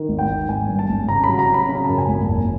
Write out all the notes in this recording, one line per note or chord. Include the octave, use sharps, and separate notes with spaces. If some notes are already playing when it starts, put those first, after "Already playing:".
Already playing: D#3
G#1
G5
G#1
G#1 G#5
G2
A5
G#1
C#3 A#5
B5
F#3
A#5
C#3
B5
C#3
A#5
F#2 A5
G#5
G#1
F#1